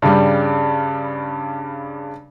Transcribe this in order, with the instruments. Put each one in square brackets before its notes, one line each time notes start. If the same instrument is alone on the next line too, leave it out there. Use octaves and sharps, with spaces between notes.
[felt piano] G2 C#3 G3